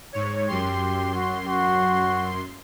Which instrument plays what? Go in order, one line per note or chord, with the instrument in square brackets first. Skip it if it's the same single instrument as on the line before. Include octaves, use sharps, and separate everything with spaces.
[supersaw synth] G#2 C#5
[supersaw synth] F#2 C6 [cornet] G4
[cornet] F#4
F#4